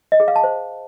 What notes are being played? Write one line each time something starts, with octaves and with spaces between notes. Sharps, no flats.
D#5
G#4
F5
A5
C5